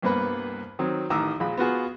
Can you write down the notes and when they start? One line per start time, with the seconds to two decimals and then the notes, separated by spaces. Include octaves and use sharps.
0.02 C2 G2 A#3 B3 B4
0.79 D#3 F#3 C4
1.10 A1 D#3 A#5 D6 E6
1.40 A#1 G#3 B5
1.57 B3 F4 F#4 G#4